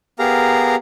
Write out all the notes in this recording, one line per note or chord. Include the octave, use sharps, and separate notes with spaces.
B3 G4 G#4 A#4 F5 A#5